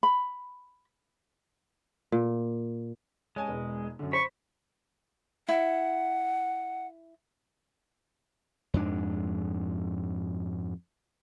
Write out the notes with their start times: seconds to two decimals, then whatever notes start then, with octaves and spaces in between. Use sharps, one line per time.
0.03 B5
2.12 A#2
3.36 G#3 C#5 G#5 A5
3.48 E1 B3
3.99 F#2 D3
4.13 C5 B5 C#6
5.49 E4 F#5
8.74 F2 G#2 D4